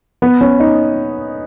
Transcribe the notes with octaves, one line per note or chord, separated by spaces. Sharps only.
B3
C#4
D#4